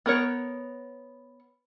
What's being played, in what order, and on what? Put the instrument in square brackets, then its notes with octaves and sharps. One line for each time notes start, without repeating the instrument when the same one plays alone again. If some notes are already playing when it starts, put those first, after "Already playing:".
[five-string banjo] B3 A#4 C#5